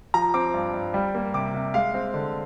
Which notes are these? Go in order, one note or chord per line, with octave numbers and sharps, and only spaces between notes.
F3 A#5
C4 D6
G2
G2
G3
A#3
C3 D6
C3
G#3 F5
C4
D3